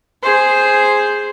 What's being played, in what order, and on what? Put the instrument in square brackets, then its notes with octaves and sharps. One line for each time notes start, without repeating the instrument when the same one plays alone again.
[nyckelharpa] G#4 C5